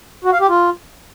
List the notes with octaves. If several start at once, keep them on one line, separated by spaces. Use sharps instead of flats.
F#4
F5
G4
F4